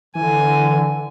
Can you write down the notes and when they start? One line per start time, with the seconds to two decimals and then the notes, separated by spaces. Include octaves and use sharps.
0.15 D3 E3 G#5